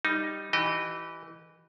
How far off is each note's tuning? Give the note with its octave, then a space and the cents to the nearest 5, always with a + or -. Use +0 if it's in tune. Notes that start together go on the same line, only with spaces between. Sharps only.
G3 +5 D#4 +0
E3 +0 G4 -35 D#5 -20